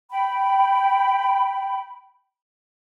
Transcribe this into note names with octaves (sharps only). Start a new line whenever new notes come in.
G5 B5